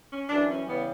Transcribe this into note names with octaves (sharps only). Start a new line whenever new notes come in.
C#4
F#2 E3 G3 D4
C#4
C#3 E3 G3 B3